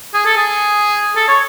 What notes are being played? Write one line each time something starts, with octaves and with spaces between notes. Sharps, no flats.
G#4
A4
G#4
A4
C#5